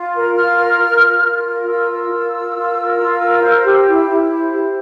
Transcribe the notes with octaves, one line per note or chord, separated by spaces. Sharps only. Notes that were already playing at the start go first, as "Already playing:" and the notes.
Already playing: F4
A#4
F4 F6
A#4
F4
A#4
F4
A#4
F4 E6
A#4
F4
A#4
F4
A#4
F4
A#4
C5
G4
E4
E4
C5
G4